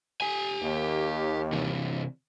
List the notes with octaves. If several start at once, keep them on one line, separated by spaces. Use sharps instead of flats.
G4 G#5
D#2
C3 E3